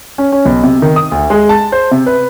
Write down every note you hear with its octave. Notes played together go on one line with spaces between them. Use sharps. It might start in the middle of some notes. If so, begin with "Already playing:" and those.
C#4
C#4
B1
C3
D#3
D#6
D2
G#3
A5
C5
C3
B4